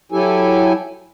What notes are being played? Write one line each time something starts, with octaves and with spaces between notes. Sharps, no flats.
F#3 E4 G4 A4 G#5